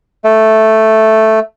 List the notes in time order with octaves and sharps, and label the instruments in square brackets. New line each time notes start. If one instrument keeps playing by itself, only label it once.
[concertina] A3